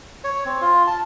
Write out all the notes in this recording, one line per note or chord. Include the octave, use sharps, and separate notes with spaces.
C#5
C4
F4
A5